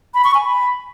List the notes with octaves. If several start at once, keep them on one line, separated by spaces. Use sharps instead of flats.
B5
C#6
G#5
B5